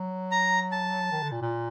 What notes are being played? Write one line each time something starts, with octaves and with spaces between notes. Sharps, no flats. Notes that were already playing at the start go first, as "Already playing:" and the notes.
Already playing: F#3
A#5
A5
D#3
D3
A#2
A#2